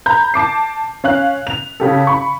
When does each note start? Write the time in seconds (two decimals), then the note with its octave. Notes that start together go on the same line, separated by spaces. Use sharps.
0.06 A#5 B5 G6
0.34 A5 D6 C7
1.04 C#4 F5 F#6
1.47 F7
1.80 C#3 G4 A4
2.07 B5 C#6